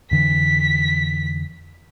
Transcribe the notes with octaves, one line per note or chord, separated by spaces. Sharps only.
F2 D3 E3 B6